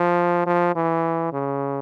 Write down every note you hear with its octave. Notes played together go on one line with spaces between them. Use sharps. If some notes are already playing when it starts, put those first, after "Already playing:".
Already playing: F3
F3
E3
C#3